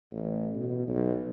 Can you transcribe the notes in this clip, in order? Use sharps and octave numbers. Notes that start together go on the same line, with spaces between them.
A1
B2
B1